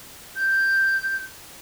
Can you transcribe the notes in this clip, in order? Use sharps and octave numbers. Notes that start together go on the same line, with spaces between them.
G6